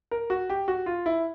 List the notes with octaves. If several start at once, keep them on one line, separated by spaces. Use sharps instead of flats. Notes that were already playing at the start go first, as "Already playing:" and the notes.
A#4
F#4
G4
F#4
F4
E4